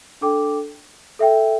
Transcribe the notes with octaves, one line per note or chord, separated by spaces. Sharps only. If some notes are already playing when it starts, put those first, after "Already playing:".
D4 A4 G5 D6
A4 E5 G5